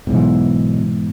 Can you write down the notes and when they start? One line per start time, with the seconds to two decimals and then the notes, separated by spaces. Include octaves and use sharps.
0.07 B1 G#2 B2 E3